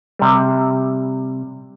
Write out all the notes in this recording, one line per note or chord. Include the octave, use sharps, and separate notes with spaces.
C3 G3